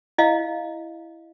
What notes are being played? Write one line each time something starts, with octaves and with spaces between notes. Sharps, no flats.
E4 D#5 F5